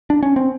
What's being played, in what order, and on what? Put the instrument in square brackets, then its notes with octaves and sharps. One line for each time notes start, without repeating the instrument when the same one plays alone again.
[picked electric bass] D4
C#4
C4